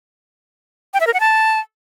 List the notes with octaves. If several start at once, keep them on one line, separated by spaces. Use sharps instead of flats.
G5
E5
A#4
F#5
A5